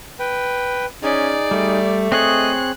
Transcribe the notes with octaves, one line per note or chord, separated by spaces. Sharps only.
B4 G5
C#4 D#4 G#4 D5
G3 A3
C4 G#4 C#5 D#5 F#6